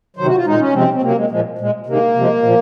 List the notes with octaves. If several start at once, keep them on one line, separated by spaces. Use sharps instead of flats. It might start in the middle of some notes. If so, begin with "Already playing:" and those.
C3 D#3 F#3 C5
F#4
F4
A#2 G#3 D#4
C#4
C3 F3 G#3 C4
C4
C3 F#3 A#3
G#3
A#2 F3 G#3
A#2 G#3
C3 D#3 G#3 A#3
C3 F3 G#3
A#2 F3